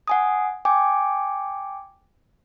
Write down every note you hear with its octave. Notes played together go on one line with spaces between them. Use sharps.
F#5 G#5 D#6
G5 G#5 D6